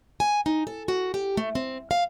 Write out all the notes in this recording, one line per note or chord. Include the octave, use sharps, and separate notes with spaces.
G#5
D#4
A4
F#4
G4
A3
C4
F5